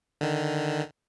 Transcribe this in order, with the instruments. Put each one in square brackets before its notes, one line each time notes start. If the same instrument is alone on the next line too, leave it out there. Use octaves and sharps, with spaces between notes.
[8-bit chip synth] D3 D#3